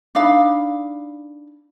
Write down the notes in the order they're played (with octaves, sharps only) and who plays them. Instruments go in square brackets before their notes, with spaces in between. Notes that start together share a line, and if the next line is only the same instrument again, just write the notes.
[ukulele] D4 D#4 F5 B5